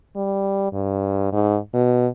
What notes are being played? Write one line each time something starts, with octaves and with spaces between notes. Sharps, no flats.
G3
G2
G#2
B2